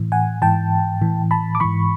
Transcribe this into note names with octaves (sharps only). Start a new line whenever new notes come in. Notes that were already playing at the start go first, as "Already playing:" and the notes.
Already playing: A2 E3
F#5 G#5
G#2 E3 G5 A5
A2 E3
A5 B5
D6
G#2 E3 B5 C#6